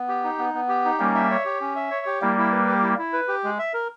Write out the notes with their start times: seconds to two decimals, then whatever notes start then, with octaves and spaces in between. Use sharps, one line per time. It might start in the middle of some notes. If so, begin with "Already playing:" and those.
Already playing: B3
0.08 G4
0.24 D#4
0.38 B3
0.54 B3
0.69 G4
0.85 D#4
0.99 G3 A#3 C#4
1.15 E5
1.30 C#5
1.45 G4
1.61 C#4
1.76 E5
1.91 C#5
2.06 G4
2.21 G3 A#3 E4
2.37 E4
2.51 B4
2.67 G4
2.82 E4
2.98 E4
3.13 B4
3.28 G4
3.44 G#3
3.59 E5
3.74 A#4